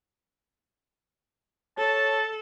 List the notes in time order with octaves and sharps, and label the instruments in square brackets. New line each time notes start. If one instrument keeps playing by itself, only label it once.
[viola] A4 [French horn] C#5 [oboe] A5